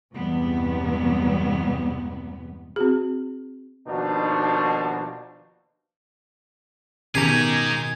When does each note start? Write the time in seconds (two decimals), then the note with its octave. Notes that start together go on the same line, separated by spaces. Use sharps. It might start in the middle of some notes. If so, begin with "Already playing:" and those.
0.14 E2 G2 C3 G3 G#3 B3
2.76 C4 F#4 G#4
3.87 D#2 B2 F3 D4 D#4 F#4
7.15 B2 D#3 C#4 D#4 G4 G#4 A#5 G#6